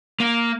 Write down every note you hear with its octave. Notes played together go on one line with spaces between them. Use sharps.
A#3